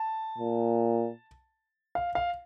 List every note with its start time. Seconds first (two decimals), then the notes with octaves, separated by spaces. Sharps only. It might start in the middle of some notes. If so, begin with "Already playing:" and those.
Already playing: A5
0.38 A#2
1.95 F5
2.15 F5